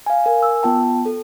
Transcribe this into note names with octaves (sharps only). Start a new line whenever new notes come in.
F5 G#5
A#4 G#5
E6
B3 F4 G5 A5
A4